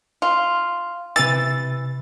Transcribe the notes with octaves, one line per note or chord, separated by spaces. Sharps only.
F4
C3 E3 E6 A6